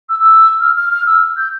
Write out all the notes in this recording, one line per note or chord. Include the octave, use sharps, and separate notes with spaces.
E6
E6
F6
F6
F6
E6
G6